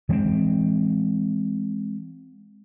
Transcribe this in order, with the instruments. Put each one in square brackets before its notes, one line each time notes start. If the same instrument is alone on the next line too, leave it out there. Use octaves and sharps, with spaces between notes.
[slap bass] E3 G#3 A#3 C4